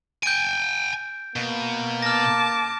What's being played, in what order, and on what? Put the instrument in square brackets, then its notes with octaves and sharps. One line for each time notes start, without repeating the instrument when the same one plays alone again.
[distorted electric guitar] G5 G#5 [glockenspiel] G6 D7
[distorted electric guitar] B2 [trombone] A#3
[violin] A5 D6 [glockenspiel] F6 A#6